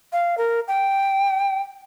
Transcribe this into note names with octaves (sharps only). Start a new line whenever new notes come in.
F5
A#4
G5